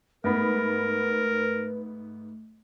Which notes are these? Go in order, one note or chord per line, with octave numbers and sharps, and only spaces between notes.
G#2 A3 B3 A#4 B4 B5